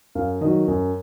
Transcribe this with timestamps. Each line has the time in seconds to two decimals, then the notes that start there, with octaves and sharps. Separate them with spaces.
0.15 F#2 F5
0.41 D#3 F#3 D#5
0.68 F#2